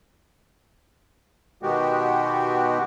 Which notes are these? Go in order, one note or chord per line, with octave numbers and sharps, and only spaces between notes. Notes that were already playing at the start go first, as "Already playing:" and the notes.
B2 D#3 G#3 B3 F#4 G4